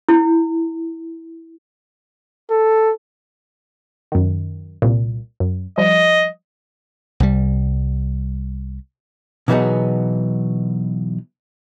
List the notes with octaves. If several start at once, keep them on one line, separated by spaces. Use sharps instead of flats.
E4
A4
F#2 D#3
C2 A#2
F#2
F3 G3 D#5
C2 G3
B2 E3 F#3 B3 D#4 G#4